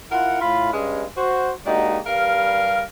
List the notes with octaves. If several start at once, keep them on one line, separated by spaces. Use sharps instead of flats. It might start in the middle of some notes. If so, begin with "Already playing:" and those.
E4 F4 A#4 F#5
A2 F4 B5
G2 G#3 C#4
F#4 C5
G#3 A#3 D4 D#4 F#4 G4
G2 G3 A#4 F5